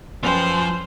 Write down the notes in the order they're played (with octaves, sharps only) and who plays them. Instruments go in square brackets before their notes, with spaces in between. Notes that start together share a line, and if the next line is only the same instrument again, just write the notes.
[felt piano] F#2 B4 G5 [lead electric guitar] F3 [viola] C5